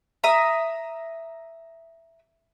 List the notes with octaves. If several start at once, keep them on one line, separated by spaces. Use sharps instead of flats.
E5 A#5 D#6